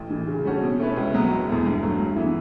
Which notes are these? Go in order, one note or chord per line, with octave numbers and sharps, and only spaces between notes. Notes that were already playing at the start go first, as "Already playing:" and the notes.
Already playing: A1
A2 E3
C#3
G3 C#4 F#4 A4
B2
A3 C#4 E4 B4
C#2
B2 F#3 B3
E1
E2 B2 A3 E4
G2
F#3 A3
G2
E3 B3 E4